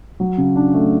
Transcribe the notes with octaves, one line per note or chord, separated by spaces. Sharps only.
F#3
C#3
D4
A3